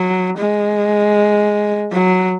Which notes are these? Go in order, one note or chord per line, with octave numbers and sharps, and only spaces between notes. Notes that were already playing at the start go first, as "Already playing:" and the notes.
Already playing: F#3
G#3
F#3